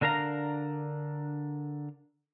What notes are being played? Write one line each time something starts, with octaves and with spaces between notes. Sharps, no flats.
D3 D4 A#4 F5 A#5